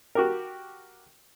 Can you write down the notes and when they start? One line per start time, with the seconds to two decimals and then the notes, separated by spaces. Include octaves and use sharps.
0.15 F#4 G4 A#4